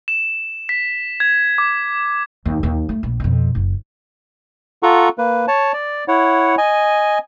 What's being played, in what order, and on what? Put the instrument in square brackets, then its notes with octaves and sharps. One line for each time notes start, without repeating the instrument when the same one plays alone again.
[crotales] E7
B6
G#6
D6
[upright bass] D#2
D#2
A3
A#1
F2 B2
F#1
[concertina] F4 A4 F#5 A#5 C#6
A#3 B4
C#5 A5
D5
E4 C#5 F#5
D#5 G#5